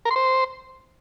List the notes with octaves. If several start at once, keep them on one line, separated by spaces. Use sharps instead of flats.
A#4
C6
C5